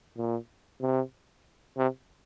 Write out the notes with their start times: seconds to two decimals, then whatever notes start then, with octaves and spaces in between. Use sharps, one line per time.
0.17 A#2
0.81 C3
1.77 C3